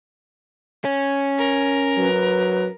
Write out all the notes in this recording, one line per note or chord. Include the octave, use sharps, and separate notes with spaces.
C#4
A#4
F#3 B4